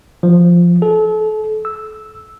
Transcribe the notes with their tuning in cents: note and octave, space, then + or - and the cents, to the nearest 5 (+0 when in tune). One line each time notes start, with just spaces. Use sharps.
F3 -5
A4 -35
E6 -5